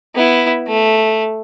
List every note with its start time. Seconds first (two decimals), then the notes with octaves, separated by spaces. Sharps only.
0.15 B3 E4
0.67 A3